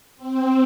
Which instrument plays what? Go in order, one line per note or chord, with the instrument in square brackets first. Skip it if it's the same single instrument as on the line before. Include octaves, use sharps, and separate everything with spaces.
[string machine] C4